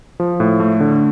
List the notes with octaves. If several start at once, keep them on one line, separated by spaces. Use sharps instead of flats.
F3
A2
A3
D3